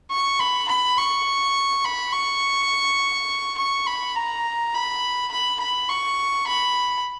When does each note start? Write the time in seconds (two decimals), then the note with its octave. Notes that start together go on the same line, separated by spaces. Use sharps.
0.11 C#6
0.40 B5
0.68 B5
0.98 C#6
1.85 B5
2.13 C#6
3.58 C#6
3.87 B5
4.16 A#5
4.74 B5
5.31 B5
5.60 B5
5.89 C#6
6.47 B5